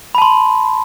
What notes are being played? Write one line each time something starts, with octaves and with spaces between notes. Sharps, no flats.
A5 B5 C6